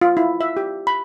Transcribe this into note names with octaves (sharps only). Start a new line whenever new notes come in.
F4
E4
E5
G4
B5